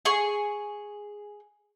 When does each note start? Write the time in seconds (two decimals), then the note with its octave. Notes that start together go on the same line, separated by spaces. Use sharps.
0.05 G#4 C#6